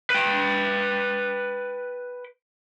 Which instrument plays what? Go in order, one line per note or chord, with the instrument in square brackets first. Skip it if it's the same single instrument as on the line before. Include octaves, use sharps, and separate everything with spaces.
[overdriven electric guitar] B4 G5